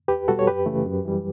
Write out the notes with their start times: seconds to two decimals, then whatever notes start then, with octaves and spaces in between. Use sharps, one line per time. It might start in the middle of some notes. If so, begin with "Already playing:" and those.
0.08 E2 G4 B4
0.28 B2 G3 F#4 A4
0.39 C#5
0.47 F#2 G4 B4
0.66 C#3 E3 A3
0.86 F#2
1.05 E3 G3